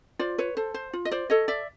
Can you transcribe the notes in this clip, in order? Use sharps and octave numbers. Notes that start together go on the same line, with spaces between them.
F4 C5 D5
B4 C#5
A4 C5
C5
F4
D#5
C5 D5
A4 C#5 D#5
D5 E5